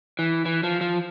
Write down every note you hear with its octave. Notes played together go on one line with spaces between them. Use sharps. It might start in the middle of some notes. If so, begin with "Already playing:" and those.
E3
E3
F3
F3